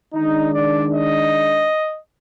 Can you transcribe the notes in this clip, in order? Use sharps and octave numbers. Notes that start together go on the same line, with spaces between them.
D#3 G#3 D4 D#4
D5
D#5